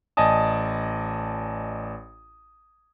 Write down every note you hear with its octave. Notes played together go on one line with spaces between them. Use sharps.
A1 D5 D#5 G#5 A5 D#6